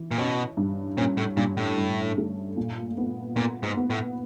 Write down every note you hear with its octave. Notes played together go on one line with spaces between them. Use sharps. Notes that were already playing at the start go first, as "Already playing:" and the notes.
Already playing: E3
A#2
B2 C#4
G2
A#2 C#4
A2
G2 A#2
A2
G2
A3
A#2
B3
A#2 B3
G#2
B3
A2